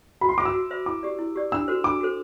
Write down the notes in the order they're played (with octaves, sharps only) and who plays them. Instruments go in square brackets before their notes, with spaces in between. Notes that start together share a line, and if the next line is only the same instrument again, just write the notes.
[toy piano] F#4 [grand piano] B5
[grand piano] C6
[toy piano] C5 E5 B5 [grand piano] D6
[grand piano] E6
[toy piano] F#4
C5 E5 B5
[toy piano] E4 [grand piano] D6
[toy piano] G4 D5
E4
G4 D5
[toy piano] D4 [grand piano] E6
[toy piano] F#4 A4 C5
[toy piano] D4 [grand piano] D6
[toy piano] F#4 A4 C5